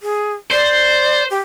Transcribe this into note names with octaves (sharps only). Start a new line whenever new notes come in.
G#4
C5 D5
G4